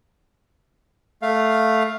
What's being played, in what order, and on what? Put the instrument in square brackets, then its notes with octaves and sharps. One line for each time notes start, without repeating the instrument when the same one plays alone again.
[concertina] A3 F5